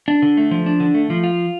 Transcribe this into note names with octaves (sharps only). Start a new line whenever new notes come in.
D4
D3
A3
F3
D4
D3
A3
F3
F4